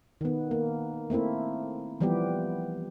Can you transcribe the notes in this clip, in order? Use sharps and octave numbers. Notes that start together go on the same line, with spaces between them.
D#3 B3
A#3
A3 A#3 C4 E4
E3 F3 G3 B3 G4